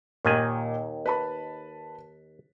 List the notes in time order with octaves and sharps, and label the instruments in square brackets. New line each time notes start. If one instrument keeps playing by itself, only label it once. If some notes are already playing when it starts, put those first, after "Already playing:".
[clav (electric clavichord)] D#2 D#3 G#5 [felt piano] A#2 A#3
[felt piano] B4 A5 B5